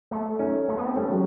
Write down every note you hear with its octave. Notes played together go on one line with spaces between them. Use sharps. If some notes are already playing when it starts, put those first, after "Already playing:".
A3
C#4 D#4
A3
B3
C4
G3 A3 C#4
F#3 G#3